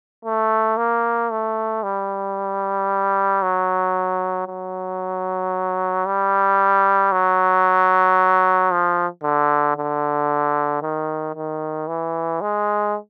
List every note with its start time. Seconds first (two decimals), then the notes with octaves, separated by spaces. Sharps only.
0.25 A3
0.77 A#3
1.31 A3
1.83 G3
3.43 F#3
4.48 F#3
6.06 G3
7.12 F#3
8.72 F3
9.24 D3
9.77 D3
10.82 D#3
11.35 D#3
11.88 E3
12.42 G#3